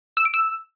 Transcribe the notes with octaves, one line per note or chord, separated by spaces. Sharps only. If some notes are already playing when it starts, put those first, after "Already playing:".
E6
D7
E6